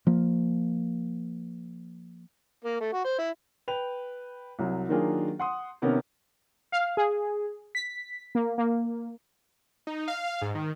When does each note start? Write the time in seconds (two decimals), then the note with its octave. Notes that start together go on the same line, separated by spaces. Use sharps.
0.07 F3 A#3
2.64 A#3
2.81 A3
2.93 F#4
3.05 C5
3.19 E4
3.68 B4 G5 F7
4.59 C2 F#3
4.89 D#3 F#3 A#3 D4 F4 G#4
5.39 F#5 C6 D#6
5.82 C3 D#3 B3 C#4 A#4
6.72 F5
6.97 G#4
7.75 B6
8.35 A#3
8.58 A#3
9.87 D#4
10.08 F5
10.42 G#2
10.55 D#3